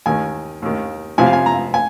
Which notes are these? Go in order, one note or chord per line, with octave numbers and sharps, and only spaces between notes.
D#2 D#3 G#5
D#2 D#3
F2 C3 F3 G#5
F5
G#5
A#5
G#5